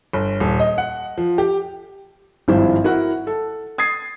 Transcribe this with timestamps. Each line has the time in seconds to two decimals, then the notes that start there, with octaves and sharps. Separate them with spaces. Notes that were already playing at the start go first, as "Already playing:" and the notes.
0.13 G1
0.40 D#1
0.60 D#5
0.78 F#5
1.18 F3
1.38 G4
2.48 G#1 G2 F3 E4 C5
2.84 E4 F#4 A#4 F#5
3.27 A4
3.78 D#6 G#6 A6 C7